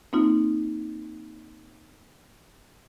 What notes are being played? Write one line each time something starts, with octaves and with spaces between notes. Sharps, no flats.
A#3 C4 D#4 F4